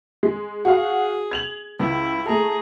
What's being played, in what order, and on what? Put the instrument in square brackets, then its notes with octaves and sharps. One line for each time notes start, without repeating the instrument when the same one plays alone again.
[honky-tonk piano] G#3
[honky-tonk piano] F#4 F5 [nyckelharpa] G#4
[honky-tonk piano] G#6 F7 F#7
[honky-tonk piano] C#2 [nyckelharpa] E4
[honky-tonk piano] A3 A4 [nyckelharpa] G#4 A#5